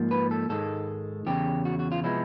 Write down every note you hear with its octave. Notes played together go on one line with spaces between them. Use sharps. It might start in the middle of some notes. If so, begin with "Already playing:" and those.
Already playing: G#2 F3 A#3
B4
A4
G#2 D#3 G#3 A4
E2 C#3 G4
F#4
F#4
F4
C3 F3 G#3 B3 E4